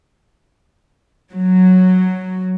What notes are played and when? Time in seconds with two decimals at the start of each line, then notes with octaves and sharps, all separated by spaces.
1.32 F#3